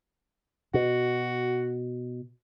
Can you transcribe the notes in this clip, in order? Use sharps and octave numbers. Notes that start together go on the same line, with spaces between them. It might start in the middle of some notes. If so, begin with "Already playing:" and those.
B2 F#4